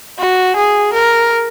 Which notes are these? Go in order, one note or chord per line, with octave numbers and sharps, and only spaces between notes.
F#4
G#4
A#4